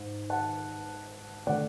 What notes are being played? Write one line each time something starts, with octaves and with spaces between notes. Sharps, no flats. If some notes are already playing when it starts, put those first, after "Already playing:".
Already playing: G#2
F#5 A5
D3 A3 D5 F#5